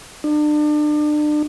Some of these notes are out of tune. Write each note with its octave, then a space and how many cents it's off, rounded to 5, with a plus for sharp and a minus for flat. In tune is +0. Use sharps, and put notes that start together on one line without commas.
D4 +35